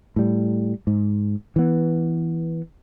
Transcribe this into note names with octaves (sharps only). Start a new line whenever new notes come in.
A2 G3
G#2
E3 B3